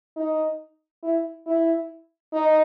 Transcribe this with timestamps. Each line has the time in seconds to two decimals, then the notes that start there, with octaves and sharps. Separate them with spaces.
0.16 D#4
1.03 E4
1.46 E4
2.33 D#4